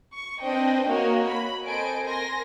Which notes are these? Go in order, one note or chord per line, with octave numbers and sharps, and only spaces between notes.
C#6
C4 D4 B4 C5 D#5 G5
A#3 F#4 A#4 C#5 D#5
B5
C4 A4 C5 D#5 G#5 D7
A#4 G#5 C6 A#6